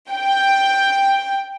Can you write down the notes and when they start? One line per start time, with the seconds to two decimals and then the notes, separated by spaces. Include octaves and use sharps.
0.12 G5